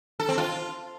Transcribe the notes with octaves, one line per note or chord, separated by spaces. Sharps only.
A4
C4
F4